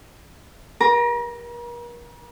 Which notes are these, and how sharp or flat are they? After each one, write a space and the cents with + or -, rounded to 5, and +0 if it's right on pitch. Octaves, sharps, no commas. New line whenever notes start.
A#4 +40 A#5 +0